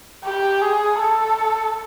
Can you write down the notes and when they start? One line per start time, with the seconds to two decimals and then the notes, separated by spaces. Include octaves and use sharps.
0.24 G4
0.62 G#4
1.00 A4